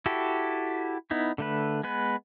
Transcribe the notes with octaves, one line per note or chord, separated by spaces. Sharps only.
E4 F#4 G4 A4
B3 D#4 E4
D3 A3 B4
G#3 B3 B4